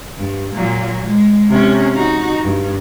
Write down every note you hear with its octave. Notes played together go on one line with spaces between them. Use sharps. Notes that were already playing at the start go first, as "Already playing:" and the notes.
G2
A#2 F#3
G#3
C3 C#4
D#4 F#4
G2